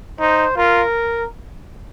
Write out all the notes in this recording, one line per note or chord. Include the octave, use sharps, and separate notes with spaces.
D#4 C5
F4 A#4